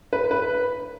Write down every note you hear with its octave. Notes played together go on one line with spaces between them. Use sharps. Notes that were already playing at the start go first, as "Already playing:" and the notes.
B4
B4